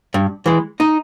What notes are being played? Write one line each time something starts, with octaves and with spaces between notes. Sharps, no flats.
G2
E3 G#3
D#4